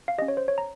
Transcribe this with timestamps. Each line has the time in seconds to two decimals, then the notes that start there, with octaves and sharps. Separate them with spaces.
0.08 F5
0.18 C#4 G4 D#5
0.28 C#5
0.37 C5
0.48 C#5
0.58 A#5